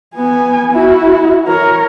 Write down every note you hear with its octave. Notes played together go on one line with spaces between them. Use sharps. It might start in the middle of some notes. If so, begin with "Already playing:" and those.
B3 G#5
E4 F#4
A#4 C#5